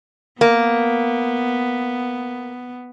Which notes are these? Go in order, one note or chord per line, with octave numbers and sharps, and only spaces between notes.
A#3 B3